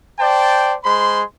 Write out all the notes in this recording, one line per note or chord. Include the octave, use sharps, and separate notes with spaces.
C5 D5 G5 A5
G#3 C5 B5 C6